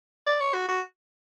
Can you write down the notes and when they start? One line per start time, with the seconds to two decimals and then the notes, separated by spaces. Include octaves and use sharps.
0.26 D5
0.40 C#5
0.54 F#4
0.68 F#4